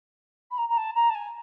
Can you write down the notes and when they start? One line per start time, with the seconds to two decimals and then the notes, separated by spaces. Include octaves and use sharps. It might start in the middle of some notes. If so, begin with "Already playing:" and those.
0.51 B5
0.58 A#5
0.69 A#5
0.77 A5
0.95 A#5
1.09 A5
1.15 G#5